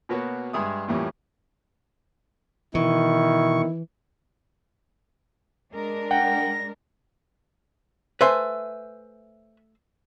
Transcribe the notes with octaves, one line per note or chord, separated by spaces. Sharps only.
B2 A#3 B3 F#4 C#5
G2 G#3 G#4 E5 D#6
F2 A2 E3 G3 A#3 C#4
B2 D#3 E3 E4 C#6
G#3 D4 A#4
F#5 G5 A#6
A3 B4 C5 E5 G#5 C6